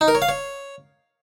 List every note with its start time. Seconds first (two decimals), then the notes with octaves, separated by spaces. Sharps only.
0.01 D#4
0.08 A#4
0.15 C#5
0.22 F5
0.29 C#5